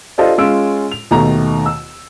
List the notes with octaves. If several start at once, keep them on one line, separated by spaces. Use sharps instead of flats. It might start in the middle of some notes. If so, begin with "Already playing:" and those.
D4 F4 G4 A4 C5 D#5
G#3 C#4 F4 E6 D7
F7
D#2 B2 D#3 A3 A#5
E6